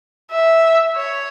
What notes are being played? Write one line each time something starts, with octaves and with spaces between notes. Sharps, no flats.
E5
C#5